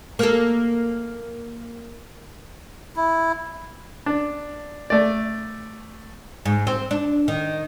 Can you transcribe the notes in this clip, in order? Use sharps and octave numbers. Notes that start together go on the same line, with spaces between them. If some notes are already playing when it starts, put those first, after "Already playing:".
A#3 A4
E4
D4
A3 D5
G#2
C4
D4
D#3